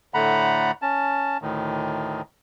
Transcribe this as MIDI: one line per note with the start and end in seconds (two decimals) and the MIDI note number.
0.14 0.71 45
0.14 0.71 50
0.14 0.71 57
0.14 0.71 78
0.14 0.71 82
0.14 0.71 83
0.82 1.37 61
0.82 1.37 81
1.42 2.21 38
1.42 2.21 45
1.42 2.21 51